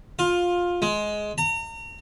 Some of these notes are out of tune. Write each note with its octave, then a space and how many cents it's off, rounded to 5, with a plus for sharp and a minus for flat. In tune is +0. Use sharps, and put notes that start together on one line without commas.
F4 +15
G#3 +15
A#5 -35